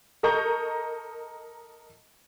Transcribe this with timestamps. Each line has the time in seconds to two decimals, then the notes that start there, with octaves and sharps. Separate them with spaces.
0.23 A4 A#4 D#5 A#5 C#6 G6